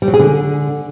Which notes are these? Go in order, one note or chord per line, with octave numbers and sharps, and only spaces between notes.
G3
F#3
G#4
D3